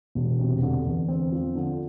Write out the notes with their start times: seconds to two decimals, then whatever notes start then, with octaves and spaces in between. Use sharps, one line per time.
0.15 E1
0.39 C3
0.62 D3
0.85 E2
1.08 C4
1.32 F3
1.55 D3